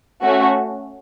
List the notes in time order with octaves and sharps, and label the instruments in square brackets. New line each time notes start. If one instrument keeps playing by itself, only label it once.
[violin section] A3 C#4 F#4